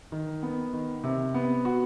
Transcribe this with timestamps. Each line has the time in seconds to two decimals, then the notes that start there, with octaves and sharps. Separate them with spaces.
0.12 D#3
0.43 B3
0.73 D#3
1.04 C3
1.34 B3
1.65 F#4